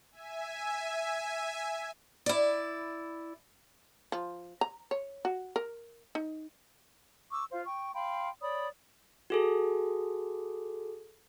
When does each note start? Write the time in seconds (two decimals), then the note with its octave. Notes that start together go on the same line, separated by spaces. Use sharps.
0.12 E5 G#5
2.26 E4 D5
4.12 F3
4.61 A#5
4.91 C#5
5.25 F#4
5.56 A#4
6.15 D#4
7.31 C#6 D6 E6
7.51 F4 C5 F5
7.65 G5 C#6
7.94 F5 G5 B5 C6
8.41 C#5 D5 B5 D#6
9.30 F#4 G#4 A4